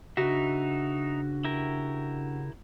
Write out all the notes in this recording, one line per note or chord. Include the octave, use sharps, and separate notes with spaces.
C#3 D4 D#4 F#4 B4 E5 F#5
E4 G4 A#4